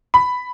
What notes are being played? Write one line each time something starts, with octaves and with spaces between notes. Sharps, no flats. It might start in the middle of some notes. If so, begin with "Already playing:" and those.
B5